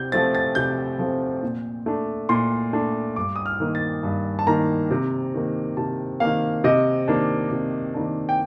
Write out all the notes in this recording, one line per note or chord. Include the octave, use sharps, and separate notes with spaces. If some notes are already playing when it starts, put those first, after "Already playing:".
Already playing: C3 G6
F3 A3 C4 A6
A6
C3 G6
F3 A3 C4
A#2
A3 D4
A#2 C6
A3 D4
G2 D6
D#6
F6
D#3 A#3
A6
G2
A5
D#3 A#3 A#5
C3
D#3 A#3
C3 A5
D#3 A#3 F5
C3 D#5
D#3 A#3 D4
C3
D#3 A#3 D4
G5